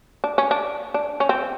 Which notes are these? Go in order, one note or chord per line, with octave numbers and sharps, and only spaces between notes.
D4
C#4
D4
D4
C#4
C4